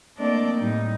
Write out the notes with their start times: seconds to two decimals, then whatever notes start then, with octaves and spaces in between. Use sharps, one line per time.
0.18 A3 A#3 C4 D4 D5 D#5
0.58 A2 G3 D#4